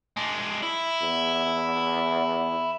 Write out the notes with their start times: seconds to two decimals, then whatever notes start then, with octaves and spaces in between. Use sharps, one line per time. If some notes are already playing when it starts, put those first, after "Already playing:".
0.17 G#3 D4
0.63 E4
1.01 E2